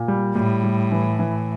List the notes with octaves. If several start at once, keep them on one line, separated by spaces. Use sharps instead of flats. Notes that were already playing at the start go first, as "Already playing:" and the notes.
Already playing: A#2
G3
A2 G3
G3
E3
E3